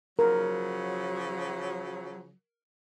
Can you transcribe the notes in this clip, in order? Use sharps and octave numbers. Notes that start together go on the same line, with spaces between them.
C#3 F3 F#3 A#4